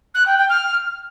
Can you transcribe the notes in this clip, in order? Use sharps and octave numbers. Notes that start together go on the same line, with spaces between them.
F#6
G5
G5
F6